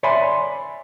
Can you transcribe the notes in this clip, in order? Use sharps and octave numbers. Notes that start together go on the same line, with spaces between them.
C#5 D5 E5 G#5 B5 C6